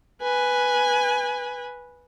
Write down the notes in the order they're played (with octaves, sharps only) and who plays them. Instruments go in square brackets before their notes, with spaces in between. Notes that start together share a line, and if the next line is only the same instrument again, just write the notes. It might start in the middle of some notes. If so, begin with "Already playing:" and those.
[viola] B4 G#5